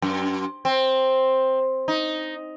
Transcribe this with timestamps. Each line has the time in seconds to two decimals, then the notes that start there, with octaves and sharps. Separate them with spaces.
0.02 F#2
0.65 C4
1.88 D#4